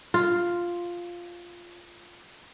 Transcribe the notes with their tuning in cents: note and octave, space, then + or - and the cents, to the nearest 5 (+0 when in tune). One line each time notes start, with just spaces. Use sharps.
F4 +0